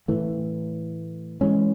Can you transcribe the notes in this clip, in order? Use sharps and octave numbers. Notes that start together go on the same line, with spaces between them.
A2 E3 A3
E3 G#3 C#4